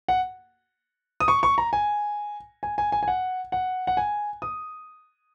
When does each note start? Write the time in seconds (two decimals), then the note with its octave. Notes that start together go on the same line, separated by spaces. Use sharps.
0.08 F#5
1.20 D#6
1.28 C#6
1.43 C#6
1.58 A#5
1.73 G#5
2.63 G#5
2.78 G#5
2.92 G#5
3.03 G#5
3.08 F#5
3.52 F#5
3.87 F#5
3.97 G#5
4.42 D#6